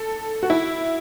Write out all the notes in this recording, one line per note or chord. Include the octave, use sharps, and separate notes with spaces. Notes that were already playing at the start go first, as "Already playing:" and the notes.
Already playing: A4
F#4
E4